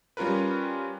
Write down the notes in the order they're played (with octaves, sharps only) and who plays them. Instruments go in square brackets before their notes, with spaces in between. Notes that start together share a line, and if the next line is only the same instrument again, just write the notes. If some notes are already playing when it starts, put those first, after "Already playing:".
[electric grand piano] G3 C#4 F4 A#4 B4